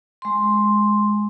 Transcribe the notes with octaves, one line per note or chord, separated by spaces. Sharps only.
G#3 C6